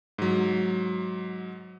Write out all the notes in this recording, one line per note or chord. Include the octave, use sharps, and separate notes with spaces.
G#2 F#3